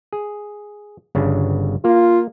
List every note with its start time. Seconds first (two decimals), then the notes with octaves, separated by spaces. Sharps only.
0.13 G#4
1.15 G1 C#3 D4
1.84 A#3 F4